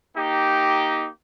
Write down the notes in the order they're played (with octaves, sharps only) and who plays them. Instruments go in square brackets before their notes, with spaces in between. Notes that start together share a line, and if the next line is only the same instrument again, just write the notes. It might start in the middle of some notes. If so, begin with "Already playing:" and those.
[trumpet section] A#3 D#4 G4